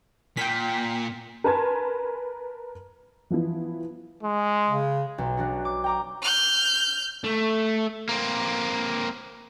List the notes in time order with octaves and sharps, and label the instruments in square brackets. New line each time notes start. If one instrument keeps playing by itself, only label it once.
[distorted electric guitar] A#2 [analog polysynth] G5 B6
[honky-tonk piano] A#4 B4 G#5 A5 C6 G#6
E3 F3 B3 E4
[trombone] G#3
[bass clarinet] C#3
[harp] B1
F#3 D4 F#4
D6
G5 A#5 D6
[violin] F6 G6
[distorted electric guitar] A3
[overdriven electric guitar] A#3 C4